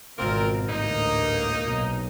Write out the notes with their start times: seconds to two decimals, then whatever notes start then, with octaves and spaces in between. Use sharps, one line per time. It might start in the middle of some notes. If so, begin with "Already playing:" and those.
0.18 G#1 B2 C4 F4 A#4
0.69 A1 D2 G#2 A#3 D#4
1.64 B1 A#2